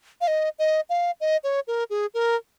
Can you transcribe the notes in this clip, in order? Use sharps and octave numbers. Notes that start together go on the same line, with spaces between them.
F5
D#5
D#5
F5
D#5
C#5
A#4
G#4
A#4